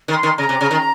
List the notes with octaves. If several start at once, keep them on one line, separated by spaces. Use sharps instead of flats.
D#3
C6
D#3
C#3 A#5
C3
C#3
D#3